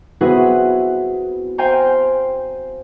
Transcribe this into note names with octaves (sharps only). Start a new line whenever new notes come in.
B3 C4 E4 F#4 G#4 B4
C5 F5 G5 G#5 A#5 C6